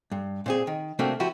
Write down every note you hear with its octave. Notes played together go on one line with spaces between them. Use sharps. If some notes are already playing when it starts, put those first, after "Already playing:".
G2
A#2 C4 G#4
D#3
C3 A3 A#3 C4 D4 F#4
F3 E4 F#4 G4